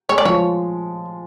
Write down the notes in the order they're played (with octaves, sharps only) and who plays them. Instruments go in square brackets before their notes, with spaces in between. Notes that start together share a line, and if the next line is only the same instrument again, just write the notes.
[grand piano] G#3 [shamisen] C#5
[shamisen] D5
[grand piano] F3 [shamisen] C#5